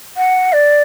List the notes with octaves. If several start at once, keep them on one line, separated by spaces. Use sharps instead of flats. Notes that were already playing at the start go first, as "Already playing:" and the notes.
F#5
D5